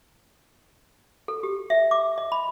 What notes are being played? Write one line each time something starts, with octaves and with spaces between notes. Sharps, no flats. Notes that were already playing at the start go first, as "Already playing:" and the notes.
A4
G4
E5
D6
D#5
B5